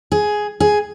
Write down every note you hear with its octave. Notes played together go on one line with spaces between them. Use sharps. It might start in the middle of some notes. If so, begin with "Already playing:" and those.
G#4
G#4